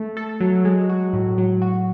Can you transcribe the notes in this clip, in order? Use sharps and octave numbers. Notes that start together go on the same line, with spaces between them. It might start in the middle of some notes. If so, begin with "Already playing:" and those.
Already playing: A3
A4
F#3
G#3
F#4
A2
F#3
F#4